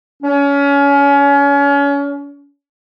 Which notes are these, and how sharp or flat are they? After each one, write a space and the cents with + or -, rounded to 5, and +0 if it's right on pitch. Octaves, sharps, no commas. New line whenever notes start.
C#4 +30